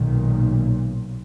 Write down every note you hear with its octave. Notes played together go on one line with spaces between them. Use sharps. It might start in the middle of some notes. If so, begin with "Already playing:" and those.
Already playing: B1 A#2 D#3